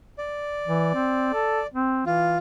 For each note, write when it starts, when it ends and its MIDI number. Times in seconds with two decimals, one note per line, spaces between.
0.18 1.67 74
0.67 0.93 52
0.94 1.30 60
1.34 1.61 69
1.74 2.04 60
2.06 2.38 52
2.06 2.38 65